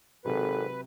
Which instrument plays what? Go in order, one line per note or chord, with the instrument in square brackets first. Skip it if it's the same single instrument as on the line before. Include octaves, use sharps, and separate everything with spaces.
[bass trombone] G#1 [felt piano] C3 F#3 [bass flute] A4 [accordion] B4